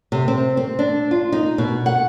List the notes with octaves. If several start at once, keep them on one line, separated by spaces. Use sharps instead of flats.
C3
C4
C4
D4
F4
D#4
B2
F#5